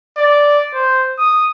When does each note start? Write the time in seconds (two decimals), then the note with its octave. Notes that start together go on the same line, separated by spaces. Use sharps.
0.18 D5
0.74 C5
1.18 D#6